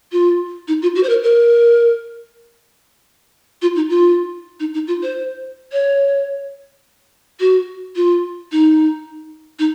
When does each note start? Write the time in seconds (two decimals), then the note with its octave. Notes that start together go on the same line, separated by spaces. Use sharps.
0.12 F4
0.68 D#4
0.82 F4
0.95 F#4
1.03 C5
1.09 A#4
1.23 A#4
3.62 F4
3.76 D#4
3.90 F4
4.60 D#4
4.74 D#4
4.87 F4
5.03 C5
5.72 C#5
7.40 F#4
7.96 F4
8.52 D#4
9.59 D#4